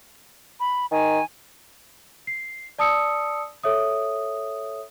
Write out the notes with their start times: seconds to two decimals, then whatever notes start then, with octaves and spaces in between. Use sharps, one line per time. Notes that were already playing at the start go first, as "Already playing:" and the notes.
0.60 B5
0.92 D#3 G#5
2.27 C7
2.78 D5 A5 D#6 E6 C#7
3.64 A4 C#5 E5 D#6